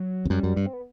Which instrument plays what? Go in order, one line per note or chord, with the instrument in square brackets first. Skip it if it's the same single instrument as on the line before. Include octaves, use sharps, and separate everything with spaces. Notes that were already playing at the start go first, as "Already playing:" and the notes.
Already playing: [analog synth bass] F#3
[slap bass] E2
[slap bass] F#2 [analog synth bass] G3
[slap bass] F#2
G2
[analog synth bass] C4
B3